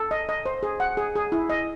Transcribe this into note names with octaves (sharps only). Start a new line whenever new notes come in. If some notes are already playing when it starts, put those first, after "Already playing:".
Already playing: A4
D#5
D#5
C5
G#4
F#5
G#4
G#4
E4
D#5